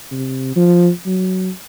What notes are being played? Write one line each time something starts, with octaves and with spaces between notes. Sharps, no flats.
C3
F3
F#3